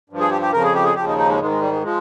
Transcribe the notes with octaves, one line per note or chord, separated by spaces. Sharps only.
G2 F3
G#4
G4
G4
F2 C#3 F3 A#4
G#4
G4
G#4
D#2 C#3 F3 G4
D#4
D#4
G#3
G#2 D#3 G#3
G#3
G3
G#3
F3 G#3